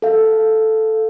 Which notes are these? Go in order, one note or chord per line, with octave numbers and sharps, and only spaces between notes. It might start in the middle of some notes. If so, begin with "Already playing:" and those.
A4 F5